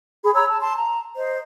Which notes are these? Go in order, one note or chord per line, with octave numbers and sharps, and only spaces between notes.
G#4 B5
C#5 A#5 B5 E6
A5
A5 C6
A#5
C5 D#5